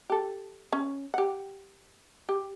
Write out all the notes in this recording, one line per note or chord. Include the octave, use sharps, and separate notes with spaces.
G4 A4
C#4
G4 F#5
G4